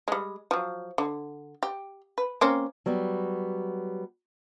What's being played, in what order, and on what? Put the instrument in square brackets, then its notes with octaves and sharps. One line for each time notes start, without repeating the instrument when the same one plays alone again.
[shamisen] G3 G#3
F3 F#3
D3
G4
B4
A#3 C4 C#4
[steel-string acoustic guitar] F#3 G3 B3